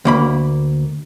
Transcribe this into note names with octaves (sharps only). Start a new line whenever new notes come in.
D2 A#3 B5